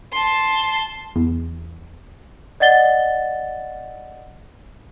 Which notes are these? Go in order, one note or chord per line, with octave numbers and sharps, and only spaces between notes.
A5 C6
E2
D5 D#5 F#5 A6 G7